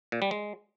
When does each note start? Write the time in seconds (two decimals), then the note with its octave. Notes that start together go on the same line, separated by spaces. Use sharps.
0.12 A#2
0.22 G3
0.31 G#3